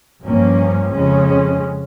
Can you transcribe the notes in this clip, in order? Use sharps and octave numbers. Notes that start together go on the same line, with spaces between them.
G2 F3 A#3 C#4
F2 C#3 G#3 C#4